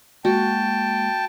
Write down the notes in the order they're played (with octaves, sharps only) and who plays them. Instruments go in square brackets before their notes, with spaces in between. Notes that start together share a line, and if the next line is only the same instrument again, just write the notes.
[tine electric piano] G#3 A#3 [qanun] F#4 [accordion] G5 A5